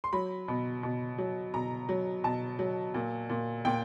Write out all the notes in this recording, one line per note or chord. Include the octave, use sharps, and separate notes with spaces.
C6
F#3 B5
B2
B2
F#3
B2 A#5
F#3
B2 A5
F#3
A#2
A#2
A#2 G5